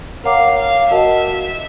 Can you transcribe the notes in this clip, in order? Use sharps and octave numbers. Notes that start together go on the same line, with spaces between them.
A#4 C#5 F5 F#5 A#5 D6
F5
F#4 A#4 D#5 E5 F#5 A5